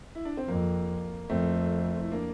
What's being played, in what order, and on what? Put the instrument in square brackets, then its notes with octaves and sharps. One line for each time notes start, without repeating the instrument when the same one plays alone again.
[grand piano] E4
D4
C4
[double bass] F2 [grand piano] A#3
[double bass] F2 [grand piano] A3 C4
[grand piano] E4
A#3 D4